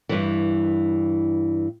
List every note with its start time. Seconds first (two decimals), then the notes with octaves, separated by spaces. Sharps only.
0.09 G2 E3